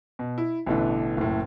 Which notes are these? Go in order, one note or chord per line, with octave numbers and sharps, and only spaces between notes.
B2
E4
A1 B2 D3 E3
F#1 A2